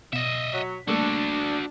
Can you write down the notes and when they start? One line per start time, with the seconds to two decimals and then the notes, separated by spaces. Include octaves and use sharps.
0.13 B2 D#5 E5
0.54 F#3 B6
0.88 G3 A3 A#3 D4 F#4 A4